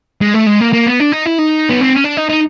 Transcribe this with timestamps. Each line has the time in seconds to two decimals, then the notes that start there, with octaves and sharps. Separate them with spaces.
0.21 G#3
0.34 A3
0.47 G#3
0.61 A#3
0.73 A#3
0.86 B3
1.00 D4
1.12 D#4
1.26 E4
1.38 D#4
1.70 B3
1.81 C4
1.93 C#4
2.04 D4
2.17 D#4
2.30 D#4